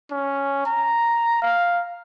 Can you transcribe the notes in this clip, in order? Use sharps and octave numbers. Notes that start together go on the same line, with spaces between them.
C#4
A#5
F5